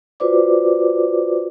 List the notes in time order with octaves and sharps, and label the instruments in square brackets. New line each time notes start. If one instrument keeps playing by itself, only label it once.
[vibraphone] F4 F#4 B4 C5 D5 D6